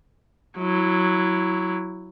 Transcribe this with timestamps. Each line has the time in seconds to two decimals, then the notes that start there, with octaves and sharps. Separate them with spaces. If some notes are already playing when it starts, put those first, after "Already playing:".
0.58 F#3 E4